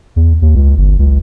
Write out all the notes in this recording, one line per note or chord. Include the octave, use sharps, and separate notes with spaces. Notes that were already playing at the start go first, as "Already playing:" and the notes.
E2
D#2
C#2
G1
C#2